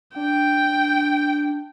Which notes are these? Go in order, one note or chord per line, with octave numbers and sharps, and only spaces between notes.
D4 G5